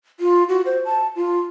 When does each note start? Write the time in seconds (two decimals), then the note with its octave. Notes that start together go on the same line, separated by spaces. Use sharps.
0.20 F4
0.49 F#4
0.66 C5
0.85 A5
1.16 F4